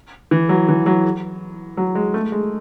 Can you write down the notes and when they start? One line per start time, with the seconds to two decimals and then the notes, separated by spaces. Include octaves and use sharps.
0.31 E3
0.49 F#3
0.69 E3
0.86 F#3
1.77 F#3
1.95 G#3
2.14 A3
2.32 G#3